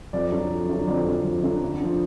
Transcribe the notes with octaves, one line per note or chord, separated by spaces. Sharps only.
F2 D5
D3 F#3
F2
D3 F#3
F2 D5
D3 F#3
F2
D3 F#3
D2
D3 F3